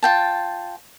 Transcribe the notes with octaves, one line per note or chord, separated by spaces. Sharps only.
F4 G5 A5